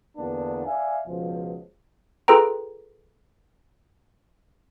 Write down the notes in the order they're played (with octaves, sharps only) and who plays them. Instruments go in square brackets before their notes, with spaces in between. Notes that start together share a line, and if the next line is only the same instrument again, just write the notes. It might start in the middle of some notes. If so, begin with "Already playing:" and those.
[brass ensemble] E2 D3 A#3 B3 D4
D5 E5 F5 G#5
C#2 B2 F3
[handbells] F4 G#4 A4 B4 G5 A#5